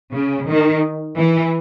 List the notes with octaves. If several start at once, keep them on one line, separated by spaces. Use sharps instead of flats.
C#3
D#3
E3